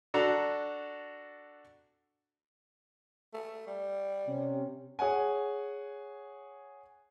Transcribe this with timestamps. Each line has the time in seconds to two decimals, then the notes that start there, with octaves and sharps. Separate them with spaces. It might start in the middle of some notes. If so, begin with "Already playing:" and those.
0.14 D4 F#4 A4 A#5
3.34 A3
3.67 G3
4.28 C3 C#4
4.99 G#4 C#5 F#5 G#5